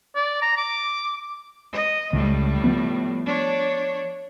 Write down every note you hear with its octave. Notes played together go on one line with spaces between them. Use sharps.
D5
A#5
D6
D#5
C#2 A2 G3
F3 B3
D4 C#5